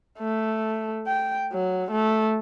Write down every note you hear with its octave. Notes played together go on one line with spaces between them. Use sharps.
A3
G5
F#3
A3